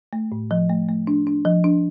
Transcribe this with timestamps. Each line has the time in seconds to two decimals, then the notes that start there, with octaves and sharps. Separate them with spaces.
0.13 A3
0.32 A2
0.51 F3
0.69 A3
0.89 A3
1.07 D4
1.27 D4
1.45 F3
1.64 D4